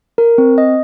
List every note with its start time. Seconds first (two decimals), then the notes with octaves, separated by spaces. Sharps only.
0.18 A#4
0.38 C4
0.58 D#5